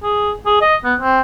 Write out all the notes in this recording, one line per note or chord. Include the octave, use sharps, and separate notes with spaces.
G#4
G#4
D#5
B3
C4